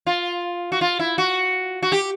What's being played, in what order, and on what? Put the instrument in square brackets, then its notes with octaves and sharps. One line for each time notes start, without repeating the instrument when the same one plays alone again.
[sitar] F4
F#4
F4
E4
F#4
F#4
G4